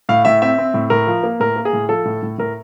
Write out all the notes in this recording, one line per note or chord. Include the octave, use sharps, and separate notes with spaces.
A2 F5
A2 E5
C4 E5
C4
A2
A2 A#4
F3
A#3
A2 A#4
A#3
G#4
A2
F3 A4
A2
A2
A2 A#4